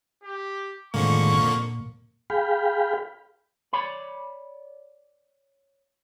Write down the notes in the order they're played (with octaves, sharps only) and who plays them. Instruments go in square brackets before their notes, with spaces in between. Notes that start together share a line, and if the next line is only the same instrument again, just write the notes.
[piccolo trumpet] G4
[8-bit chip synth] F2 D3 A#3 [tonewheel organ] A2 D#3 G#3 [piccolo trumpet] C#6
[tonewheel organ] A#2
G#4 F5 G5 B5
[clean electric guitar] C#5 D5 B5